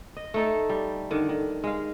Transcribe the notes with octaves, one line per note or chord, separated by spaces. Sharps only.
D#5
A3 D#4 A4
G3
D3 D#3
D#3
G#3 F5